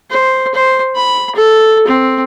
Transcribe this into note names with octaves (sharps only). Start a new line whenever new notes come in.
C5
C5
B5
A4
C4